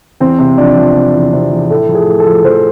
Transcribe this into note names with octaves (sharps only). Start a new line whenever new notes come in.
E2 C4
C3
F3 D4
F3
C3
E2
C3
E2
A2 A3
F3
G#4
A2
A4
F3
F3 C5